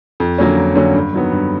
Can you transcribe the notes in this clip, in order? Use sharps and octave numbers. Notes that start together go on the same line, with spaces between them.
F2
D3 F#3 A#3 C#4
F2
D3 F#3 A#3 C#4
G2
D#3 F#3 B3
G2